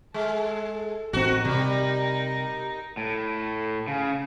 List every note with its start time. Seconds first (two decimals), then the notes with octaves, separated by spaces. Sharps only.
0.14 G#3 A4
1.13 A1 C4 D#4 F#4 A#4
1.45 C3 G3
2.97 A2
3.88 C#3